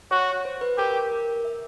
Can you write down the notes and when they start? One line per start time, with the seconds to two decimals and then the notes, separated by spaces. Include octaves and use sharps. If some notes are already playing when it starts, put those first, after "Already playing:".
0.11 F#4 C#5
0.45 C5
0.61 B4
0.78 G4 A#4
1.12 A#4
1.45 E5